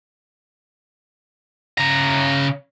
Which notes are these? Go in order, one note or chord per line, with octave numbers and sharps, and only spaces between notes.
C#3 A#5